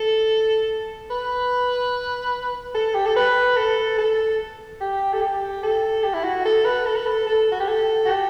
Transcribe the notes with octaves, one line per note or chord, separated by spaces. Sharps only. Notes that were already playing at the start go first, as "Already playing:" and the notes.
Already playing: A4
B4
A4
G4
A4
B4
A4
A4
G4
A4
G4
A4
G4
E4
F#4
A4
B4
A4
B4
A4
A4
F#4
G4
A4
F#4
G4